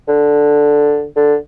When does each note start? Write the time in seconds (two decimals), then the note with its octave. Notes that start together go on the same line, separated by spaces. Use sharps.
0.08 D3
1.16 D3